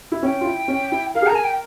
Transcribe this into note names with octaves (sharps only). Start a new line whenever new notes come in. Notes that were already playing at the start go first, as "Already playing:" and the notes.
E4
C#4 G5
F4
E4
C#4
E4
A#4 F5
G#4
A#5
A#4 G#5
G5